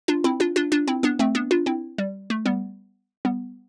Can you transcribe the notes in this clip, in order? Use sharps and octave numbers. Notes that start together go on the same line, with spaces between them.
D4 F4
C4 E4
D4 F4
D4 F4
D4 F4
C4 E4
B3 D4
A3 C4
B3 D4
D4 F4
C4 E4
G3
A3
G3 B3
G3 B3